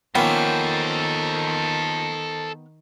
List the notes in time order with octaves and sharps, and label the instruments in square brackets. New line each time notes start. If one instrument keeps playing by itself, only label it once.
[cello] D#3 [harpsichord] F3 A#3 C#4 [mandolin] B3 G5 [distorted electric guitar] A4 C5